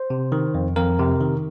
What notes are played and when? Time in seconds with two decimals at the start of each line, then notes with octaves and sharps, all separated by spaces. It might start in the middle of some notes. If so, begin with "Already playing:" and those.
Already playing: C5
0.10 C3
0.32 D#3
0.55 F2
0.76 F2 A#4
0.99 C3
1.21 D#3